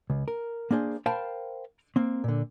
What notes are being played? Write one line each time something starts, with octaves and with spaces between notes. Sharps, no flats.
C#2
A#4
A#3 D4 G#4 C5
A#4 C5 F5 G5 A5 B5
A#3 C4
A#2 D3